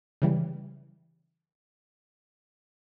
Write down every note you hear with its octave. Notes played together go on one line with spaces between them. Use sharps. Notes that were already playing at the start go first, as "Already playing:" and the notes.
C#3 E3 G3